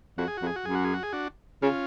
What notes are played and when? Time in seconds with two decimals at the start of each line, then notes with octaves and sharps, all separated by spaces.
0.18 F2 F#4
0.28 G#4
0.37 F#4
0.42 F2
0.46 G#4
0.56 F#4
0.65 F#2 G#4
0.75 F#4
0.85 G#4
0.94 F#4
1.03 G#4
1.13 D4 F#4
1.62 C#3 C#4 F4